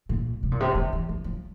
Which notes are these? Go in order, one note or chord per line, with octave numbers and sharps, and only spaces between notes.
A#2
C3
A#2
C3
D3
E3
E3
F3